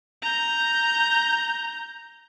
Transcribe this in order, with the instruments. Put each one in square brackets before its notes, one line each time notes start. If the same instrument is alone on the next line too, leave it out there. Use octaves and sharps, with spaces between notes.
[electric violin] A#5 G6